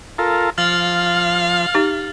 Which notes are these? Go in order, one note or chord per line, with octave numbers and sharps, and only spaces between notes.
F4 A4 A#4
F3 F5 F6 A6 F#7
D#4 G4